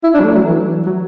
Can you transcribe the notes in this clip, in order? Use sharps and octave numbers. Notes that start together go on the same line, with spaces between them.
E4
D4
F#3
A3
F#3
E3
F#3